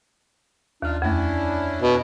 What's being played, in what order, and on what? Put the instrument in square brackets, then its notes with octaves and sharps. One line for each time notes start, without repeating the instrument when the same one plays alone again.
[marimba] D#2 F6 [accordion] D4 D#4 F4
[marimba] F2 A3 [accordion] C#4 D4 E4
[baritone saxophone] B2